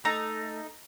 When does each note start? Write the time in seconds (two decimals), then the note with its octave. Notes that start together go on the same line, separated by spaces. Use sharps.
0.05 A3 D#4 A#5